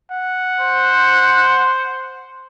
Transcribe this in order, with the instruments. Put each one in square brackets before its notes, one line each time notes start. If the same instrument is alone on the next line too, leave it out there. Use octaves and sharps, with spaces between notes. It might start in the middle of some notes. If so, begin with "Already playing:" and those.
[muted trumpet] F#5
[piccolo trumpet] C5